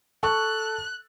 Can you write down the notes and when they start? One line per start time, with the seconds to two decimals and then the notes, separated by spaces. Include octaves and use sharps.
0.23 A4 A5 C#6 F#6